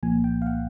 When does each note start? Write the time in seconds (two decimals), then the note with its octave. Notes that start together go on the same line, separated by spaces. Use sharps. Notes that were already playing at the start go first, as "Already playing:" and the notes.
0.03 C2 A#2 F3 A#3 G#5
0.24 G5
0.42 F5
0.46 F#5